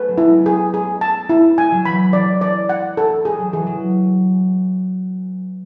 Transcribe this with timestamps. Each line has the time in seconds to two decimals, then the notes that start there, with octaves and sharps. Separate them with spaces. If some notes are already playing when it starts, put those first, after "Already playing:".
Already playing: A3 B3 C#4 B4
0.09 F#3
0.18 E4
0.27 G#3
0.41 G#3 A3 G#4
0.74 G#4
1.01 A5
1.29 E4
1.57 G#3 G#5
1.72 F#3
1.85 E3 B5
2.13 E3 D5
2.41 D5
2.69 F#5
2.97 A4
3.25 G#3 G#4
3.39 F#3
3.53 E3 G#4
3.67 F#3